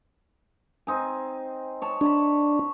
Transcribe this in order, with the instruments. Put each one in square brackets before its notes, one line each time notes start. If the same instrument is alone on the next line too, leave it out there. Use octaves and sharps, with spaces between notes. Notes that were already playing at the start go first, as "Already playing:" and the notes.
[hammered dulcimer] C4 D#4 G#5
C#5 A5
[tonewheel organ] D4 [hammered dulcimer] C#5 A5 B5